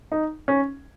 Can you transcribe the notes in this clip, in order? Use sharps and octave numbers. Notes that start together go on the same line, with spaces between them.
D#4
C#4